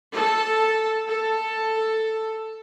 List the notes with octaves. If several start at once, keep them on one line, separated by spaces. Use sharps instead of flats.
A4
A4